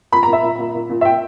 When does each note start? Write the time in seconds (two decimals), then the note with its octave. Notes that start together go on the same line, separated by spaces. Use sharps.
0.12 A#2 B5
0.23 A#5
0.28 A#2
0.33 E5
0.43 A#2
0.58 A#2
0.75 A#2
0.90 A#2
1.01 E5
1.05 A#2 G5